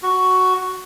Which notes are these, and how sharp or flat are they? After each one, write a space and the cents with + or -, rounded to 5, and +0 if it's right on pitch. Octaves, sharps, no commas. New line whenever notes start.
F#4 +5